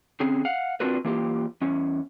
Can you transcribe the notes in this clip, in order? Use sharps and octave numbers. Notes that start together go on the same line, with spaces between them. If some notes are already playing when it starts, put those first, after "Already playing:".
D3 C4 C#4 G#4
F5 F#5
C4 D4 F4 F#4 A#4 B4
E3 A#3 F4 G4
E2 C#4